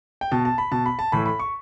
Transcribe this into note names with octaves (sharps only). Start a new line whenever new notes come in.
G5
B2 A5
A5
B5
B2 A5
B5
A5
A2 E3 B5
B5
C#6